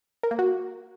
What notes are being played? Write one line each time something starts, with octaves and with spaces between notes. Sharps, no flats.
A#4
A#3
F#4